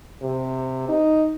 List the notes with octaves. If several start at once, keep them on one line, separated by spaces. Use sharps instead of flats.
C3
D#4